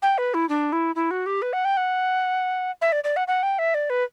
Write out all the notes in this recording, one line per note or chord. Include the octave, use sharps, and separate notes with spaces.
G5
B4
E4
D4
E4
E4
F#4
G4
B4
F#5
G5
F#5
E5
D5
D5
F#5
F#5
G5
E5
D5
B4